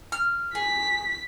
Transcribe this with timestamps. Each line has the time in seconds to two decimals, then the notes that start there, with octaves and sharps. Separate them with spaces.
0.12 F6
0.55 G#4 B6